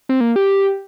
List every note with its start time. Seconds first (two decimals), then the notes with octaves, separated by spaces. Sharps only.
0.09 C4
0.21 A#3
0.36 G4